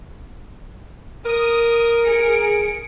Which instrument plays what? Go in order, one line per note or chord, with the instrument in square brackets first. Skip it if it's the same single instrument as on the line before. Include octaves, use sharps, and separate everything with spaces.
[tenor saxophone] A#4 [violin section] D#6
[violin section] G#4 C#7 D7